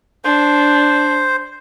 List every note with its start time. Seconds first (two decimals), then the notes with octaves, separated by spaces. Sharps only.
0.24 D4 C5